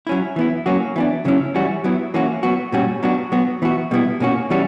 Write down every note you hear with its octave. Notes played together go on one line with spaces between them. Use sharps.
F#3 C#4 E4
E3 B3 E4
F#3 A#3 C#4 F#4
E3 B3 D4
C#3 F#3 C#4 E4
E3 G3 C#4 F#4
F#3 B3 E4
E3 A#3 C#4 F#4
F#3 B3 F#4
A#2 G3 C#4 F#4
F#3 B3 D4 F#4
F#3 B3 F#4
E3 B3 F#4
B2 G3 B3 E4
B2 A#3 C#4 F#4
E3 G3 C#4 F#4